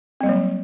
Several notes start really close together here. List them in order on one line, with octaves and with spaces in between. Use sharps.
C4 G3 A#3 F#3